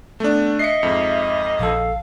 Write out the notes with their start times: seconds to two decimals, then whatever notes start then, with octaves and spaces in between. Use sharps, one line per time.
0.20 A3 B3 D4
0.59 D#5 E5 C7 C#7
0.83 F2 G#2
1.59 A#1 A4 F5